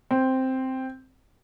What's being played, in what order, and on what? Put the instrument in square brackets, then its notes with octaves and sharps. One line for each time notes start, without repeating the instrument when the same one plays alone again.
[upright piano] C4